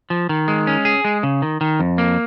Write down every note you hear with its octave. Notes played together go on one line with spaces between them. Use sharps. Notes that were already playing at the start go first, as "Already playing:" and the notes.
F3
D#3
G#3
C#4
G#4
G#3
C#3
D#3
D#3
F2
A#3